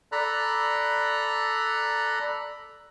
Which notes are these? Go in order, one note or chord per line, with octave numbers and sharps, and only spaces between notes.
A4 D5 A#5 B5 F#6